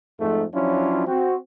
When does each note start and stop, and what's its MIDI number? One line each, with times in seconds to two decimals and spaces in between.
0.20 0.44 41
0.20 0.44 44
0.20 0.44 57
0.54 1.07 53
0.54 1.07 54
0.54 1.07 61
0.54 1.07 62
0.54 1.07 64
0.54 1.07 65
1.07 1.36 60
1.07 1.36 66